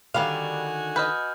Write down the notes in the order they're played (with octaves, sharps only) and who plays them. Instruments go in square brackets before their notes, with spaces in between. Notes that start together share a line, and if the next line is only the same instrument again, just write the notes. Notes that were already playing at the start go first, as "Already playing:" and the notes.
[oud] D3 D#3 [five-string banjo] G3 F5 [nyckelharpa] F#4 G#5 [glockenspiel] F7
[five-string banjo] B4 D#5 [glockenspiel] F6 G6